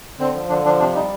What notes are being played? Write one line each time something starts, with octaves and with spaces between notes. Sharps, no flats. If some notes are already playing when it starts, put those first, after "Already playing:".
D3 C4
F3
D3 D4
F3 D4
C3 D4
G3 D#4